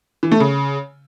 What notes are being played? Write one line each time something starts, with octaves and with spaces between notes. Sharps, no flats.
E3
A3
C#3